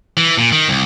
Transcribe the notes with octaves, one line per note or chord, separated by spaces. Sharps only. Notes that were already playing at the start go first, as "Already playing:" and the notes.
E3
A#2
D#3
C2